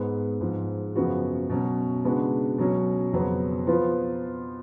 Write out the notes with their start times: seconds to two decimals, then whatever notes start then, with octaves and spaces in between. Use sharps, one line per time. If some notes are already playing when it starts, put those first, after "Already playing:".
Already playing: G#2 G#3 B3
0.41 G#2 F3 G#3
0.95 F#2 C#3 F3 B3 F#4
1.50 B2 F#3 C#4
2.05 C#3 G#3 B3 D4 F#4
2.58 B2 F#3 C#4
3.13 F2 C#3 F#3 B3
3.67 F3 B3 F4 B4